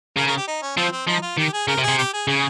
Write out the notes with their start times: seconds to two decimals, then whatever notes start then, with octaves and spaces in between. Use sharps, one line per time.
0.17 C#3 A#4
0.27 A#4
0.37 G4
0.48 D#4
0.62 C#4
0.77 F3 C4
0.92 C4
1.07 F3 D#4
1.22 F4
1.38 D#3 G4
1.53 G#4
1.68 C#3 A#4
1.78 C3
1.83 G#4
1.88 C3
1.98 G4
2.13 G#4
2.27 C#3 G#4